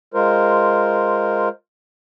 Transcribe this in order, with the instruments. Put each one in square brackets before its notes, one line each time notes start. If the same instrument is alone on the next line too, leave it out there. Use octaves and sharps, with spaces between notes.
[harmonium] G#3 F4 A#4 C5